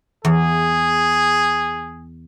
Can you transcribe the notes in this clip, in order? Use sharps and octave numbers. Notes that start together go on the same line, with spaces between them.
E2 G#4